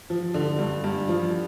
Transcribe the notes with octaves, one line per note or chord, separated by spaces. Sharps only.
F3
D3
G2
G2
F3